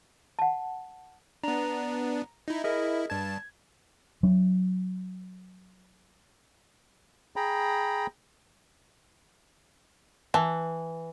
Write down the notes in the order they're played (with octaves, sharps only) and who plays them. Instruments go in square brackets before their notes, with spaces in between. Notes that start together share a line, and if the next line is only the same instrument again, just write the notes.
[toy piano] F#5 A5
[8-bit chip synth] B3 D4 [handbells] A#5
[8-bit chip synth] D#4 E4
[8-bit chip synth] E4 [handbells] G#4 A#4 D#5
[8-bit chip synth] G2 A5 [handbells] G#6
[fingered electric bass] F#3 D4
[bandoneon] G#4 G5 A#5 B5
[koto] E3 [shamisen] B4 A5